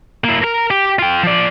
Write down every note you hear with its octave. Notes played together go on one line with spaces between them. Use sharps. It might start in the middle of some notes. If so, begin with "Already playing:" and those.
A#3 E4
A#4
G4
F4 G5
F3 D5